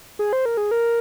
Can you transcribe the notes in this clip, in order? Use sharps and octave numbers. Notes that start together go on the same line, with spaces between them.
G#4
C5
A#4
G#4
A#4